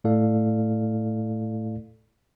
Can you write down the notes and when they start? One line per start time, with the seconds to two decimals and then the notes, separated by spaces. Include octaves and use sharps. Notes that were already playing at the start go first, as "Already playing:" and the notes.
0.04 A2 A3 E4 A4 D5 F5